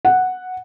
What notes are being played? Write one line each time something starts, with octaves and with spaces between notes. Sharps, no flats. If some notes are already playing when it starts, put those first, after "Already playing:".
F#5